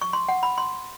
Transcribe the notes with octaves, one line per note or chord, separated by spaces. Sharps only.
C#6
C6
F#5
B5
C6